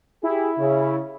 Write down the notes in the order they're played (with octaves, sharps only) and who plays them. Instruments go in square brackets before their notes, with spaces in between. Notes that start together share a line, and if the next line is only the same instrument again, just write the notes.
[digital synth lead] E4 [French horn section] G4 G#4
[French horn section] C#3